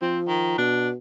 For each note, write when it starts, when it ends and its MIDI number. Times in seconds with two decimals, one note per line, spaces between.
0.02 0.55 53
0.02 0.19 60
0.27 0.56 51
0.58 0.95 47
0.58 0.89 62